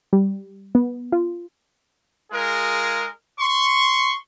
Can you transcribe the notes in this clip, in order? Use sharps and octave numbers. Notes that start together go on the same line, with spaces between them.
G3
B3
F4
G#3 F4 G#4 A#4
C6 C#6